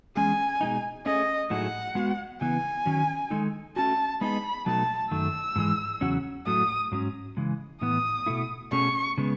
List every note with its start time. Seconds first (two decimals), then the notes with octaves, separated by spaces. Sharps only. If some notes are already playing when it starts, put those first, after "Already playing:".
0.15 E2 B2 G#3 C#4 G#4 G#5
0.61 B2 G#3 D#4
1.06 A3 C#4 G#4 D#5
1.50 A2 F#3 A3 D#4 G#4 F#5
1.95 G#3 B3 F#4
2.41 C#3 E3 B3 G#5
2.86 D#3 F#3 C#4
3.30 D#3 G#3 D#4 A4
3.76 A3 C#4 F#4 A5
4.21 G#3 B3 D#4 G#4 D#5 B5
4.66 B2 F#3 A3 D#4 A5
5.11 F#2 D#3 A3 E6
5.56 G#2 E3 G#3
6.01 E2 C#3 F#3 C#4 F#4
6.46 A2 F#3 A3 D#6
6.92 G#2 F#3 C#4
7.37 C#3 E3 G#3
7.81 A2 E3 B3 D#6
8.26 B2 A3 E4
8.72 B2 A3 C#4 G#4 C#6
9.18 C#3 G#3 B3